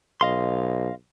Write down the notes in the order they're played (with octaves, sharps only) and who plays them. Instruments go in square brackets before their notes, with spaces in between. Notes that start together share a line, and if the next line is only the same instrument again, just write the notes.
[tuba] B1 [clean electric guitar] D#5 F5 C6